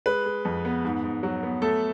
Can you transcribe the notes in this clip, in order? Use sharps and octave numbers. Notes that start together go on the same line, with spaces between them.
G#3 B4
G#3
F2
B3
G#2
G#2
F#3
B3
A3 A4